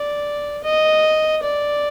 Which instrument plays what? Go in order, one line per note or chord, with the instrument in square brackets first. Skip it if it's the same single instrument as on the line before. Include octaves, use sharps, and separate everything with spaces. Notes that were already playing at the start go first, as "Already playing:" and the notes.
Already playing: [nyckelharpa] D5
D#5
D5